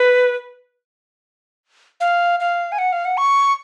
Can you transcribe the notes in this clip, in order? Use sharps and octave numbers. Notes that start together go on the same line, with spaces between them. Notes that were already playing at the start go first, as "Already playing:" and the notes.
Already playing: B4
F5
F5
G#5
F#5
F5
F#5
C#6